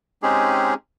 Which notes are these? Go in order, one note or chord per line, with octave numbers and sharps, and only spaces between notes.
G#3 C4 C#4 D#4 G4 G#4